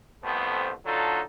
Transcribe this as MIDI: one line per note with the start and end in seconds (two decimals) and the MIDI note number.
0.23 0.73 36
0.23 0.73 41
0.23 0.73 57
0.23 0.73 59
0.23 0.73 72
0.85 1.21 50
0.85 1.21 54
0.85 1.21 62
0.85 1.21 63
0.85 1.21 65
0.85 1.21 69